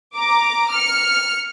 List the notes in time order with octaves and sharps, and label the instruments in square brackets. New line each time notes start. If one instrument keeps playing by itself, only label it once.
[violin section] A#5 D6
F6 C#7